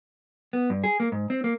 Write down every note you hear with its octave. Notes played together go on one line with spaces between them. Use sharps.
B3
G2
G#4
A#3
G#2
C4
A#3